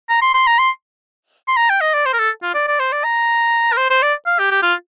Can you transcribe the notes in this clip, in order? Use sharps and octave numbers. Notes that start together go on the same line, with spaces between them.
A#5
C6
C6
A#5
C6
C6
A#5
G5
D#5
D5
C5
A#4
A4
F4
D5
D5
C5
D5
A#5
A#4
C5
C5
D5
F5
G4
G4
F4